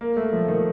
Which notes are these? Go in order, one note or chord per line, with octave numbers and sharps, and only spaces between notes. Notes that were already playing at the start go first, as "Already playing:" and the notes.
A#3
A3
F3
D#3